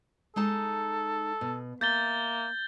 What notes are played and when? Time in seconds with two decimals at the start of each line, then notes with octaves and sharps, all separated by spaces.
0.36 G#3 D#4 A4 A5
1.41 B2
1.81 A#3 E5 G6 A6 G7